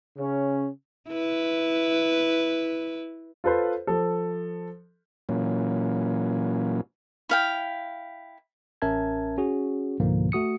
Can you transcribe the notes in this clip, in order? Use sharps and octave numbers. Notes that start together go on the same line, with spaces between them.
C#3 C#4
E4 B4
F4 A4 B4 C5
F3 A4
A#2 E3 F#3 A#3 C#4
E4 F5 G5
A1 C#4 A#4 E5 A5 G#6
C#4 F#4 G#4
C#2 G#2 B2 D3 F3 A#3
A3 F#4 D#6 C#7